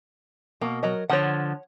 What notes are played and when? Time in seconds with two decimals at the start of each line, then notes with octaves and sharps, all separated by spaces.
0.61 B2 A#3
0.83 F#3 A#4 D#5
1.10 D3 F3 C#5 F#5